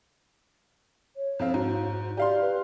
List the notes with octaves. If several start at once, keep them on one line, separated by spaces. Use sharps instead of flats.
C#5
F2 C4 F5
G#2 F#4
G4 D5 F5 C6
B4